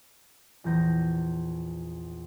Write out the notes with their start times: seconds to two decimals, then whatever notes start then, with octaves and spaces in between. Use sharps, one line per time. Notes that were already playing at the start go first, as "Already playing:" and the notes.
0.64 A#1 E2 E3 G6 A#6